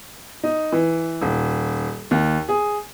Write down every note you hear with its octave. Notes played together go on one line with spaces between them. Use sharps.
D#4
E3
D#1
D#2
G#4